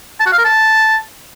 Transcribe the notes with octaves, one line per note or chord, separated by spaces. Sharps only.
A5
F#4
F5
A#4
A5